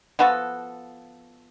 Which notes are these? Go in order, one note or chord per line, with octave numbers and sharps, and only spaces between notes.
F3 B3 F#4 A4